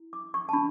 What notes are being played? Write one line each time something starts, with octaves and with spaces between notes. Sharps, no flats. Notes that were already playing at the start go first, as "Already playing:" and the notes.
Already playing: E4
D6
C#6
A5
D4 F#4 B5